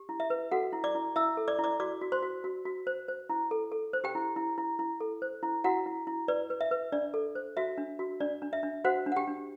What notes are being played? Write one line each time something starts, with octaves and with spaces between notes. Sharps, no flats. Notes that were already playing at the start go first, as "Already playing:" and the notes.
Already playing: G4
E4
E5
B4
F#4 A4 F#5
E4
D5 D6
E4
E4 E5 E6
A4
D5 D6
E4
D5 D6
F#4 D5 D6
F#4
C5 C6
F#4
F#4
F#4
C5
C5
E4
A4
A4
C5
G4 G5
E4
E4
E4
E4
A4
C5
E4
E4 F#4 F#5
E4
E4
B4 D5
B4
E5
B4
D4 D5
A4
C5
F#4 E5
D4
F#4
D4 D5
D4
E5
D4
F#4 C5 F#5
D4
F#5
G4 G5
D4